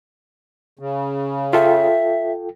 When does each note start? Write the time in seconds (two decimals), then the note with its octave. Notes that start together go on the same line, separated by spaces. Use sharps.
0.79 C#3
1.53 F4 A4 E5 G5